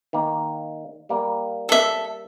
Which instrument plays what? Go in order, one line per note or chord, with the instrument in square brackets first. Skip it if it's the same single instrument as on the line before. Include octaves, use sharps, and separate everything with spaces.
[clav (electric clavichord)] D#3 A#3
G3 A#3
[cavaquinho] A4 E5